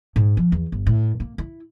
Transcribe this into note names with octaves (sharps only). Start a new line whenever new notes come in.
G#2
F3
E2
G1
A2
A#3
E4